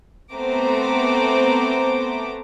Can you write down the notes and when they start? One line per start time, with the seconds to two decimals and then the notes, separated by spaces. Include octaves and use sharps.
0.33 A3 B3 C4 C5 A#5 D6